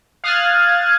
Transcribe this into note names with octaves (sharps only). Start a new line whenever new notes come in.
F5 D#6 F6 F#6 G#6 A6